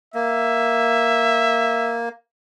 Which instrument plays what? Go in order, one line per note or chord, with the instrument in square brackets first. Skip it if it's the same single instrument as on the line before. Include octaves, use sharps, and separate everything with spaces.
[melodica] A#3 [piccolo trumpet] E5